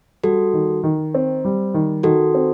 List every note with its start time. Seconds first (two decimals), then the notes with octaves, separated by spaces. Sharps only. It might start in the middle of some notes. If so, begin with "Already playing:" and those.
0.24 G3 F#4 A4
0.53 D#3
0.83 D#3
1.14 C4
1.45 G3
1.74 D#3
2.03 D#3 F#4 A4
2.35 C4